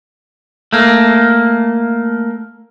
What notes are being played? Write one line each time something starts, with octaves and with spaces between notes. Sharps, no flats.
A3 A#3